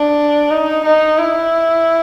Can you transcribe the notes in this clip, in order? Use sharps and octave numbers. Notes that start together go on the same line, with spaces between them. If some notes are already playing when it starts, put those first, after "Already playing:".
Already playing: D4
D#4
D#4
E4